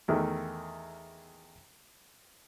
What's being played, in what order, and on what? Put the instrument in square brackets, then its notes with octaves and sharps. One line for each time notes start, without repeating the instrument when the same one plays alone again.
[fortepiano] E2 D#3 A3